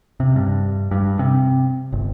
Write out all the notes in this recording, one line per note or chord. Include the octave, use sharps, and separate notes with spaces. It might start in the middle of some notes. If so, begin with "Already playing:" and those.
C3
G2
G2
C3
G1